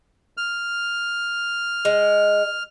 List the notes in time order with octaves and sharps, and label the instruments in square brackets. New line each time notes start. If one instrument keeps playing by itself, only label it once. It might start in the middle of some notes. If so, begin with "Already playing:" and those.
[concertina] F6
[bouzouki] G#3